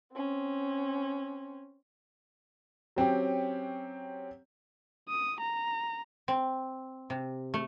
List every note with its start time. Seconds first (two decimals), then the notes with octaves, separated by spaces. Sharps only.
0.14 C4 C#4
2.96 F#3 C4 C#4 G4
5.09 D#6
5.41 A#5
6.28 C4
7.10 C3
7.54 A3